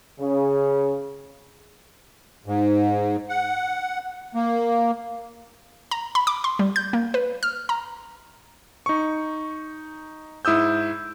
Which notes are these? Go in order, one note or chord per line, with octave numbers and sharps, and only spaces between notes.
C#3
G#2
F#5
A#3
A#5
B5
D6
C6
G3
G6
A#3
B4
F6
A#5
D#4 C#6
G#2 E4 D#6 E6 G6